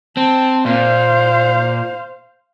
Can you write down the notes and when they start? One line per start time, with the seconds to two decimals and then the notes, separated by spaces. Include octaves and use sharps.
0.17 C4 A5
0.66 A#2 C5 F5